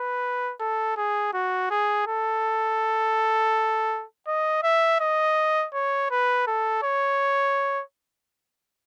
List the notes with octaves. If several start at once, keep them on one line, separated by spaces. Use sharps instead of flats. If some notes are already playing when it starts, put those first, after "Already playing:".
Already playing: B4
A4
G#4
F#4
G#4
A4
D#5
E5
D#5
C#5
B4
A4
C#5